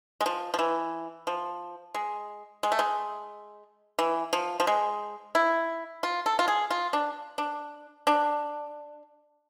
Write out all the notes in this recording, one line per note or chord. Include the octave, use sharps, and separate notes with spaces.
G#3
F3
F3
E3
F3
G#3
G#3
A3
G#3
E3
F3
F3
G#3
E4
F4
A4
F4
G#4
F4
D4
D4
D4